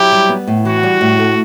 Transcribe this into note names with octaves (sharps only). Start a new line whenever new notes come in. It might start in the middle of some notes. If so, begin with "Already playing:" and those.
Already playing: F#3 E4 G4
G3
B3
A2
E3 F#4
G3
A2
A3